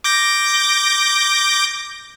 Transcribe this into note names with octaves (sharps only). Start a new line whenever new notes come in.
D6 G6 A#6